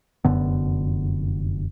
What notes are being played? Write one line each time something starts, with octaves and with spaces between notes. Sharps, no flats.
F1 F#2 D3 B3